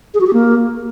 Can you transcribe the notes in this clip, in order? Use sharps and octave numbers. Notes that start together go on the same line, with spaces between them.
G#4
F#4
G4
A#3